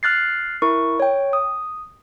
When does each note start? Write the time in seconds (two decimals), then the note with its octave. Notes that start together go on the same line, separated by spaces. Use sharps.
0.03 F6 F#6 A6 C7
0.62 E4 A#4 C#6
1.00 C#5 G5
1.33 D#6